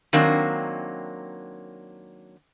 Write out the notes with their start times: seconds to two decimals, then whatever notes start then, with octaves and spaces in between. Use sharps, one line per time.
0.13 D#3 F#3 A#3 C4 D4